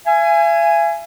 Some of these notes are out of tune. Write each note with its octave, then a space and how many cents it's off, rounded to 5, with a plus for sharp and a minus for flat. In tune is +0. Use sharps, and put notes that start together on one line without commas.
E5 +45 G#5 +0